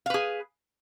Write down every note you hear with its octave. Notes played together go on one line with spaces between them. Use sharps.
G#4 B4 F5